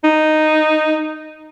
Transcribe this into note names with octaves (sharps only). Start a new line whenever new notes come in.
D#4